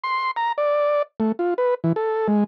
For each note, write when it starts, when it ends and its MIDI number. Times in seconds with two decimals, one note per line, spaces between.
0.04 0.31 84
0.36 0.52 82
0.58 1.02 74
1.20 1.32 57
1.39 1.54 65
1.58 1.74 71
1.84 1.93 52
1.96 2.28 69
2.28 2.44 56